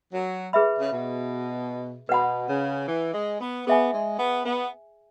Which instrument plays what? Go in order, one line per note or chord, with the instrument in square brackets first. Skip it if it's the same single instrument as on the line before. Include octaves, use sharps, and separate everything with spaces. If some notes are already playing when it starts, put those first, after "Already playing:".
[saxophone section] F#3
[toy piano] G#4 B4 E5 B5
[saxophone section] C#3
B2
[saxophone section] B2 [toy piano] B4 F#5 B5
[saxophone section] C#3
E3
G#3
B3
[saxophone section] B3 [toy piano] G#4 E5 G#5
[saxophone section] G#3
B3
B3